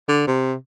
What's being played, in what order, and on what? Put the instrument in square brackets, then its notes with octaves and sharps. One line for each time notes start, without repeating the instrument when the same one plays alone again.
[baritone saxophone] D3
C3